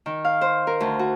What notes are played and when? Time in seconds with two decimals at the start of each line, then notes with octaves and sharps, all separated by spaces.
0.06 D#3
0.25 F5
0.41 C5
0.67 A#4
0.80 D2
0.99 F#4